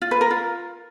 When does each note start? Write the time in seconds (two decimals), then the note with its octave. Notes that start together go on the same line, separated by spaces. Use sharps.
0.02 F4
0.11 B4
0.21 A#4
0.31 F4